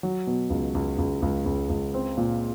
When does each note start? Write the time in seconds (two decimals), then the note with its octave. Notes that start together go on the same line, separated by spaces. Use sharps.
0.03 F#3
0.27 B2
0.50 C#2
0.75 C#2
0.98 C#2
1.22 C#2
1.46 C#2
1.70 C#2
1.94 C4
2.17 A#2